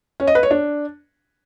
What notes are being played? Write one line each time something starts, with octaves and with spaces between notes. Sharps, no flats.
C#4
D#5
B4
C#5
D4